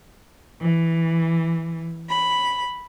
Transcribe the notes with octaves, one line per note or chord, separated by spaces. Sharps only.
E3
B5